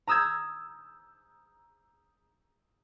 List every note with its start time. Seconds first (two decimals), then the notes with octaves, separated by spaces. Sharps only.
0.07 A#5 D#6 E6 G6 G#6